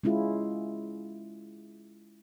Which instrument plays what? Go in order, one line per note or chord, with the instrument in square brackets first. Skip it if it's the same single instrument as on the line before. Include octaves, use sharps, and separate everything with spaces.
[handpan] G#3 C#4 E4 F4 G#4